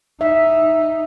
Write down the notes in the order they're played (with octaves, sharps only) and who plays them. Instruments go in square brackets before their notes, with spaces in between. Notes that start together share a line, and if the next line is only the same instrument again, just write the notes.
[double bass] D#4 [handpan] E5